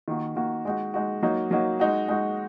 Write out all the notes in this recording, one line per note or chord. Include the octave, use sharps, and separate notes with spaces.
D#3 A#3 F#4
D#3 A#3 F#4
G#3 D#4 F#4
G#3 D#4 F#4
F#3 A#3 D#4 F#4
F#3 A#3 D#4 F#4
G#3 D#4 F#4
G#3 D#4 F#4